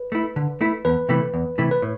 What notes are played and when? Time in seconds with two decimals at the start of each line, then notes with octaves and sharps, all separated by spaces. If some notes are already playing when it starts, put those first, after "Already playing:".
Already playing: B4
0.12 A3 E4
0.36 D3
0.61 A3 E4
0.85 E2 B4
1.09 C3 E3 A3 E4
1.34 E2
1.58 C3 E3 A3 E4
1.71 B4
1.82 A2